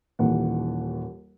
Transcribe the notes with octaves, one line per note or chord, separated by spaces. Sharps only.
D#1 D#2 E3 F#5